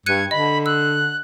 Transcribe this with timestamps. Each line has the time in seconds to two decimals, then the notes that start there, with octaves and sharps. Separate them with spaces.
0.06 G2 F#6 G#6 C#7 D#7
0.31 D3 D#5 B5
0.66 E6 F#6